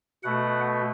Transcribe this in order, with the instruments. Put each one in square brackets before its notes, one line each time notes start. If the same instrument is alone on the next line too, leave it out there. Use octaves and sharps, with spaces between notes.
[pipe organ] B2 A3 F#5